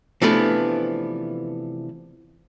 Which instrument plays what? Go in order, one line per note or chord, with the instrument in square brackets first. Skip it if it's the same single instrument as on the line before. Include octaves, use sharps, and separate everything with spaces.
[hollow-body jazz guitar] C3 E3 F3 A3 B3 D4